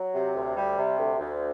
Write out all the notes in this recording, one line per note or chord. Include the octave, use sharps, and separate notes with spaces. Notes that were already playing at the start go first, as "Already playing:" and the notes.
Already playing: F#3
C3
D2
G3
C3
D2
D2